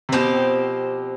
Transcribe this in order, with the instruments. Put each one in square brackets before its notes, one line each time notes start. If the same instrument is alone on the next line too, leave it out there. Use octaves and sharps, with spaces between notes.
[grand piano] C3
[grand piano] B2 [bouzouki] F3 C4 G4